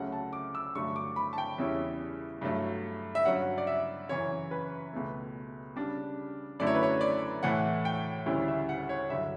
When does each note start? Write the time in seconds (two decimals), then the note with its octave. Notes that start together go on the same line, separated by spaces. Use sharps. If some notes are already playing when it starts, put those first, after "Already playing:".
Already playing: C#2 C#3 F#3 A3 C#4 F#5
0.12 A5
0.33 D6
0.55 E6
0.75 G2 D3 F#3 A3 C#6
0.96 D6
1.16 B5
1.33 A5
1.38 G5
1.58 E2 C#3 G3 C#4 E4
2.41 G2 F#3 A3
3.15 E5
3.25 G2 F#3 C#4 F#5
3.58 D5
3.67 E5
4.09 F#2 C#3 E3 C#5
4.51 B4
4.93 C#2 B2 A3
5.76 C#3 G3 D4
6.59 F#2 D3 F#3 A3 E4 D5
6.67 C#5
6.74 B4
6.83 C#5
7.01 D5
7.43 A2 E3 A3 F#5
7.85 G5
8.26 D2 C#3 G3 C#4 E4
8.48 E5
8.69 F#5
8.89 C#5
9.09 G2 D3 F#3 E5